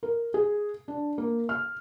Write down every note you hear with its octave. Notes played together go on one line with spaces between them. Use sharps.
A#4
G#4
D4
A#3
F6